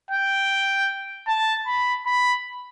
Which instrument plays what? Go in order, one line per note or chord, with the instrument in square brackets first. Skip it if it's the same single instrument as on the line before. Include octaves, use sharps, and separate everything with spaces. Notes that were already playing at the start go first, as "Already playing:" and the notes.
[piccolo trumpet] G5
A5
B5
B5